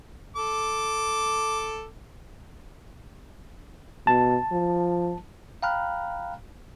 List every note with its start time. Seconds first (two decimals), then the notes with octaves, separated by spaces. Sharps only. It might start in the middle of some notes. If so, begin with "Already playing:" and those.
0.36 A4 D6
4.07 B2 A5
4.52 F3
5.62 F5 G5 A#5 B5 F6 F#6